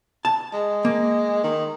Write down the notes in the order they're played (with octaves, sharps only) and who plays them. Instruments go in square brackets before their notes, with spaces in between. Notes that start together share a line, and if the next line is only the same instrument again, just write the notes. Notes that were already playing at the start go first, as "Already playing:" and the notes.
[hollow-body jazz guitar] A5
[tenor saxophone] G#3
[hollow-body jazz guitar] A#3
[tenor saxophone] D#3